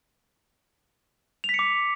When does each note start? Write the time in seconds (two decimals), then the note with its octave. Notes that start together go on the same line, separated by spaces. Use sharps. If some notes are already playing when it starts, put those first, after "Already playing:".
1.44 F7
1.49 B6
1.54 C#7
1.59 D6